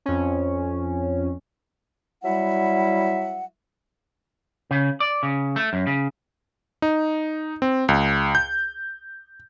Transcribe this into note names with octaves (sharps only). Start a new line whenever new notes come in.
F2 C#4
F#3 G3 E4 E5 F#5
C#3
D5
C#3
A3
F#2
C#3
D#4
C4
C#2
G6